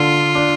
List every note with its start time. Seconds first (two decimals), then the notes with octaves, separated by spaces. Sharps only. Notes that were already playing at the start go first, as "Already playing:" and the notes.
Already playing: D3 F4
0.35 D4